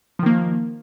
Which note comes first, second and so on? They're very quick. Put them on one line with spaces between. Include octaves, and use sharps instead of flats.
F3 D#3 A#3